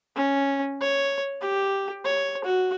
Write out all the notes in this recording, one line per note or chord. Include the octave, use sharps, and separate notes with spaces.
C#4
C#5
G4
C#5
F#4